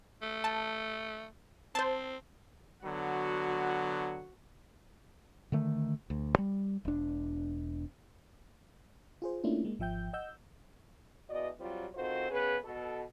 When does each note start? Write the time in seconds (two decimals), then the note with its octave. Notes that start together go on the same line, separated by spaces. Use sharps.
0.22 A3
0.44 A5
1.75 C4 C5 A5
2.84 D3 F#3 B3 F#4
5.52 D3 D#3 A3
6.10 D2
6.38 G3
6.85 E1 D4
9.22 F4 G#4 C5
9.44 A3 A#3 C#4 D4 E4 F4
9.65 G#3 A#3
9.79 G#1 F3 E5 G5 G6
10.13 D#5 F#5 E6 G6
11.30 E2 B2 F#4 D5 D#5
11.59 F#3 G3 C4 F4
11.95 D#3 C4 F4 F#4 A4 C5
12.30 C#3 B3 C#4 G#4 B4
12.64 B2 A4